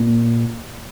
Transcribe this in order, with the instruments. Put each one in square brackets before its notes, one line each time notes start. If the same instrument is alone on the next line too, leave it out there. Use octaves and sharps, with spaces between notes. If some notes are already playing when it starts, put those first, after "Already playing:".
Already playing: [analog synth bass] A#2